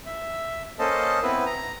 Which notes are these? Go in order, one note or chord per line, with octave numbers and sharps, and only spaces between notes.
E5
A#3 C#4 A4 C5 D#5 A5
B3 C4 E4 B4
A#5